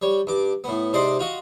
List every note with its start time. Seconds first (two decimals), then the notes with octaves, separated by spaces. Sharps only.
0.02 G3 C#5
0.27 G2 D6
0.64 A2 B3
0.93 G#2 C3 D5 D#5 C6 D6
1.19 F4 F#4 D#5